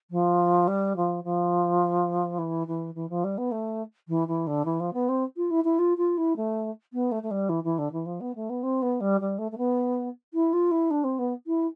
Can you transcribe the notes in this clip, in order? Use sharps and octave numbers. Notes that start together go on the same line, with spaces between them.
F3
G3
F3
F3
E3
E3
E3
F3
G3
B3
A3
E3
E3
D3
E3
F3
B3
C4
F4
E4
E4
F4
F4
E4
A3
B3
A3
A3
G3
E3
E3
D3
E3
F3
B3
A3
B3
C4
B3
G3
G3
A3
A3
B3
E4
F4
E4
D4
C4
B3
E4